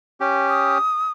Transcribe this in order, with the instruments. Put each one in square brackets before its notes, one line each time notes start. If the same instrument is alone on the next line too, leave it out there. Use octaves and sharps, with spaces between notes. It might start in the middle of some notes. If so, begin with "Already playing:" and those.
[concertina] C#4 G4
[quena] D#6